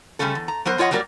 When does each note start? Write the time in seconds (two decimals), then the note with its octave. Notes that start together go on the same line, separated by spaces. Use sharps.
0.19 C#3 E3 G3 A3 C#4 A4
0.35 E2
0.48 A#5
0.65 F#3 B3 A#4 C5
0.78 F2 F4 C#5 D#5 F#5
0.91 F#3 G3 A#3 D4 A#4 D5